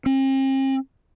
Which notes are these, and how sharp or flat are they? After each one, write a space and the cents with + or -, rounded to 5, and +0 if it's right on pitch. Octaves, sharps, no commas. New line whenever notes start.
C4 +45